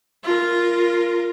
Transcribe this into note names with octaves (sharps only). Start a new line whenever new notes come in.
F4 A#4